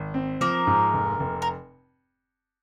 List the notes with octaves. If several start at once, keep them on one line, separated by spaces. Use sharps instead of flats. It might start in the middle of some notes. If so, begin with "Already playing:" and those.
Already playing: G#1
C4
F3 A#3 A#4
G#2
F1
F1
A#4